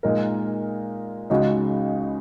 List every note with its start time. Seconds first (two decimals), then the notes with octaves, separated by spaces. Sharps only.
0.03 A#2 G#3 D#4 A#4
1.30 C#2 C#3 G#3 D#4 F#4